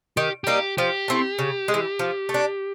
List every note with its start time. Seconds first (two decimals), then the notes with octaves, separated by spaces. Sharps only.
0.17 D#3 G4
0.44 G3 A#3 D#4 G4
0.77 F3 G4
1.08 A3 C4 E4
1.39 C#3
1.68 G#3
1.74 E3
1.99 F3
2.29 A3
2.34 D4